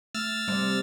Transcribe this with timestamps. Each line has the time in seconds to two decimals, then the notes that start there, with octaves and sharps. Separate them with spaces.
0.15 A3 E6 F6 A6
0.48 C3 G3 D5